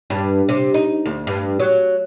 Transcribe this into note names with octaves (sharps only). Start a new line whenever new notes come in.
G2
C3
D#4
D2
G2
F#3